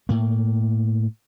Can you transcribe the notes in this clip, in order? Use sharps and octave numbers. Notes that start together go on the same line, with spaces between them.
A2 A#3